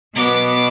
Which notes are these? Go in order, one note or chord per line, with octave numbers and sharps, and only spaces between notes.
B2 F#3 B3 D6